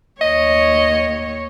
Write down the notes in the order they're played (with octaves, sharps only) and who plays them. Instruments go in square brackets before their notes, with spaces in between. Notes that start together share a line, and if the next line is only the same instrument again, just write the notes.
[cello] D#2 C#5 [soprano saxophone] D#5